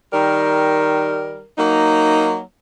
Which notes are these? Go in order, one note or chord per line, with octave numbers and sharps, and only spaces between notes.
D#3 G3 A#4
F#3 A#3 D#4